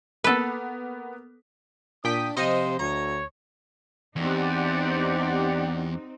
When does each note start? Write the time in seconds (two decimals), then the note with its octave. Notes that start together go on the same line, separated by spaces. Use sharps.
0.24 A#3 B3 A4 B4
2.04 A#2 D4 G5 D#6 B6
2.37 C3 F3 D#4 C5 D#5
2.79 D2 C#5 A#5
4.16 E2 C4 D#4 G4 D5 F#5